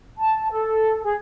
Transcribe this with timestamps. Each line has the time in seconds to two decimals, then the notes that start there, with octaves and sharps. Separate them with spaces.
0.18 A5
0.52 A4
1.03 G#4